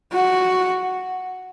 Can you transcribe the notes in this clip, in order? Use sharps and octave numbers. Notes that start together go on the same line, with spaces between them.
F#4